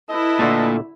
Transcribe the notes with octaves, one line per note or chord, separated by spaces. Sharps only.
E4 A4 B4 D#5
A#2 D3 A3 A5